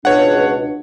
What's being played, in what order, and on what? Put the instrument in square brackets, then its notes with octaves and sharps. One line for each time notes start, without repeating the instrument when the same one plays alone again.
[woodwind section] C#2 B2 D4 [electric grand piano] C#5 F#5